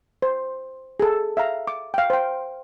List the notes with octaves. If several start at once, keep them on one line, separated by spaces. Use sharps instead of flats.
C5
G#4 A4
E5 F5 A#5
D6
F5 G5
C5 G5